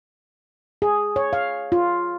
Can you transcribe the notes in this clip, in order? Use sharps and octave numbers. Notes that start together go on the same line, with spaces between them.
G#4
C#5
F5
F4